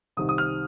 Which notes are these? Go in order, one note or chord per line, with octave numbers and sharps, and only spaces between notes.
C2 C3 D#3 D#6
D#6
F6